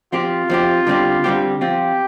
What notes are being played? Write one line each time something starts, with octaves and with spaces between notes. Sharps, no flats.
F3 C4 F4 G4
F3 C4 G4
D3 G3 C4 G4
D3 G3 C4 G4
F3 C4 F4 G4